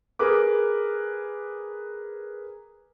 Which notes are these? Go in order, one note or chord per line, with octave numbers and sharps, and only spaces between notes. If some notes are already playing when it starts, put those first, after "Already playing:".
G#4 A#4 B4 D6